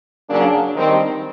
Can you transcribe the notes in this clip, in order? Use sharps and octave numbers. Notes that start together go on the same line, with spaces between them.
C#3 F#3 A#3 D4
D#3 G3 C4